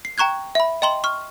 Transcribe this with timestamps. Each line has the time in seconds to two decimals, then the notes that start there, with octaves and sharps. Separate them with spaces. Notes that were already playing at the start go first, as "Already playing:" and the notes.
0.05 C7
0.18 G5 A#5 C#6 F#6 G#6
0.55 E5 B5
0.82 D#5 G5 A#5 C6 F#7 G7
1.04 C#6 F6